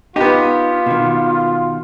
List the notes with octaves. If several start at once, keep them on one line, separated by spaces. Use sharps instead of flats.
B3 D#4 F4 G4
B2 D#3